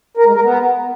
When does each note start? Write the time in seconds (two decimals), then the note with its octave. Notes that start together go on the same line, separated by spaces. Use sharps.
0.17 A#4
0.26 G#3
0.35 A#4
0.43 B3